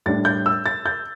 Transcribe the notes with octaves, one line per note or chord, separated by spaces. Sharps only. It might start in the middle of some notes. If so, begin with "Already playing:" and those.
A2 G3 D4 A6
G6
E6
A6
G6